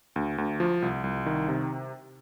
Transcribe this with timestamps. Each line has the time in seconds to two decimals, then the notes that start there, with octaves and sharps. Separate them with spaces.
0.16 D2
0.38 D2
0.60 F3
0.82 C2
1.04 C2
1.26 D#3
1.48 C3